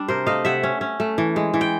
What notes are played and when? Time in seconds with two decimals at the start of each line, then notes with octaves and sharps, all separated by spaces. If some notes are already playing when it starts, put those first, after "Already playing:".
Already playing: G3 D4
0.08 C3 A#4 C5
0.27 A3 D#5 F5
0.45 C3 E5 F#5
0.63 C#4
0.81 C#4
1.00 A3
1.18 E3
1.36 G#3
1.54 E3
1.61 G5